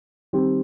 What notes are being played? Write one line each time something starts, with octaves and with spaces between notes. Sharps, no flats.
D#3 G3 C4 G4